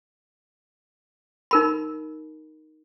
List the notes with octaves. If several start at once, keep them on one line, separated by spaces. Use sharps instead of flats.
D#4 A#4 B5